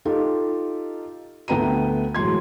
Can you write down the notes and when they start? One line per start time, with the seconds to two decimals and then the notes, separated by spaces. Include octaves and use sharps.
0.05 D#4 F4 G4 A4
1.48 D2 A3 B3 G5 A#5 D#7
2.15 E1 A2 F#3 C6 G#6